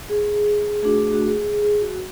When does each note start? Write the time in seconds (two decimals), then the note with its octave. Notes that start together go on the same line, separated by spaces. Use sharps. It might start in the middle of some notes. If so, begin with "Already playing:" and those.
0.10 G#4
0.82 A3 D4 F#4 G#4
0.98 G#4
1.12 F#4
1.27 G#4
1.42 G#4
1.62 G#4
1.81 F#4